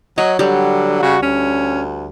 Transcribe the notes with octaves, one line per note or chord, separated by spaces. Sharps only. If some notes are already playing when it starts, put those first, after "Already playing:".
F#3 C#5 D#5
D3 F#3 G3
C#3 F#4
D2 C#4